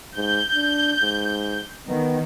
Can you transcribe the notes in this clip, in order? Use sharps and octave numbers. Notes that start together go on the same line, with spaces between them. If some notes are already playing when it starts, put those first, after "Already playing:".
G#2 G6
D4
G#2
D#3 B3